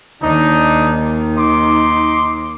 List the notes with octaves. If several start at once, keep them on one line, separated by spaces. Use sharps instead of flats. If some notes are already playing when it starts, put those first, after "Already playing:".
D#2 D#3 D4 D#4
D#4 C6 D6